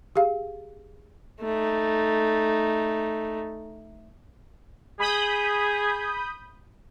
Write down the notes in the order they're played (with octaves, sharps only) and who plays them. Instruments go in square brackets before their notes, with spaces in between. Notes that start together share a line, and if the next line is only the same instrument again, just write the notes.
[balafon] G4 G#4 F5
[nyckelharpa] A3 D#4
[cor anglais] G#4 [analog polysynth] B5 D#6 G6